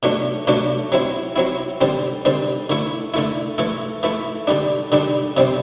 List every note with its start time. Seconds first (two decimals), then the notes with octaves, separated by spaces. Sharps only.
0.03 B2 F#3 A3 D4
0.47 B2 F#3 A3 D4
0.92 F#3 C4 E4
1.36 F#3 C4 E4
1.81 D3 G3 C4
2.25 D3 G3 C4
2.70 D3 A3 E4
3.14 D3 A3 E4
3.58 E3 A3 E4
4.03 E3 A3 E4
4.47 D3 G3 D4
4.92 D3 G3 D4
5.37 C3 G3 C4